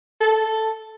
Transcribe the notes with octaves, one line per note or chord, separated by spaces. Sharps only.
A4